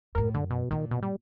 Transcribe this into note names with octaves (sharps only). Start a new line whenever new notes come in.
F#2 A2 A#4
F#2 D3
B2
F#2 A#2 D#3
B2
G3